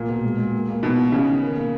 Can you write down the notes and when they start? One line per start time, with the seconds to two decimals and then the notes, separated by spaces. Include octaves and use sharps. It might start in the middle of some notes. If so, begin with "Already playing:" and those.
Already playing: A#2 A#3
0.09 B2
0.23 G#3
0.39 G#3
0.54 A#3
0.68 A#3
0.83 B2 D#4
0.97 B3
1.12 C#3 C#4
1.28 D#3
1.41 A#4
1.57 A#3